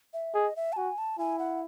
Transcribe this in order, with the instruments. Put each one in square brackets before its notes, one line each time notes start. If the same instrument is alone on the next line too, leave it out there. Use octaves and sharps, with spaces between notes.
[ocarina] E5
[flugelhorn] G#4 [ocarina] D#5
[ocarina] E5
A5
[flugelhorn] F#4 [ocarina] G#5
[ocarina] A5
[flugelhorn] E4 [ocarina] G#5
[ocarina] F#5